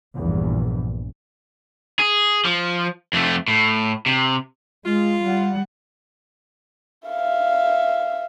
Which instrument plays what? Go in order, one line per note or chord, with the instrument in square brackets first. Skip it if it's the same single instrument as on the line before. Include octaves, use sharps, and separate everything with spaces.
[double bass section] A#1 E2 G2
[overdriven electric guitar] G#4
F3
F2 A3
A2
C3
[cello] G#3 [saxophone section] F4
[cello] G3 F#5
[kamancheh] E5 F5